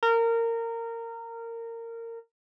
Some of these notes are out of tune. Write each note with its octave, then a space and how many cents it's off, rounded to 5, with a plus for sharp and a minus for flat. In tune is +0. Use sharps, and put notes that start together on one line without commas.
A#4 -20